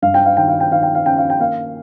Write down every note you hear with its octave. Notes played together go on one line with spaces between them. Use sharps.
G2 F5
G5
F5
D#3 G5
F5
G5
D#3 F5
G5
F5
C#4 G5
F5
G5
A#3 F5